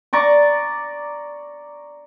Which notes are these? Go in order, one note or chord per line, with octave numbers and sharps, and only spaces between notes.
D5 A#5 C#6 D6